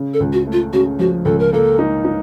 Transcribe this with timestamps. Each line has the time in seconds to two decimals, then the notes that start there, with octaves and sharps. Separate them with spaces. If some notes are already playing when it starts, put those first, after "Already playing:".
Already playing: C#3
0.14 A4
0.20 C#2
0.33 F#4
0.47 A3
0.53 F4
0.73 C#3 F#4
0.99 F3 F#4
1.25 C#2 A4
1.39 A#4
1.53 A#3 A4
1.79 D#4
2.05 D#4